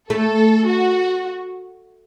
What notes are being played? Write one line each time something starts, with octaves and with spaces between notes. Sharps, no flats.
A3 A4
F#4